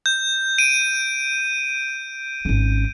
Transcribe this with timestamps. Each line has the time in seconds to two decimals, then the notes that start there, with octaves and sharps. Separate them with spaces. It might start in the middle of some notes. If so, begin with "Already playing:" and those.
0.06 G6
0.58 D7 D#7
2.45 G#1 C#4